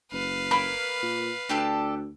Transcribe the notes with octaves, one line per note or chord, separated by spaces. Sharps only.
F#1 B4 F5
A#3 B5
A#2
D2 D4 G4 A4